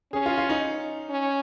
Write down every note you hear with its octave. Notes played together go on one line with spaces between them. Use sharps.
C#4 G#4
F4
F4
D#4
C#4